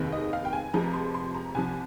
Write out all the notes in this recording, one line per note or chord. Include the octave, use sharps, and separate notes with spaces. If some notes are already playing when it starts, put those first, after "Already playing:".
Already playing: F1 D#2 D#3 G#3 C4
D#5
F5
G5
G#5
F1 F2 C3 F3 G#3 A#5
C6
C6
A#5
C2 C3 F3 G#5